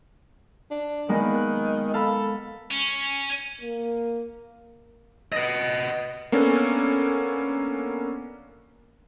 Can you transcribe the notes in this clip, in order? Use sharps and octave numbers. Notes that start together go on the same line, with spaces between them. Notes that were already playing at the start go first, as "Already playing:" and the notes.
D4
D#3 G#3 A#3 B3
F#6
A4 F5 A#5 B5
C#4
A#3
B4 D#5
A#3 B3 C#4 D4 A4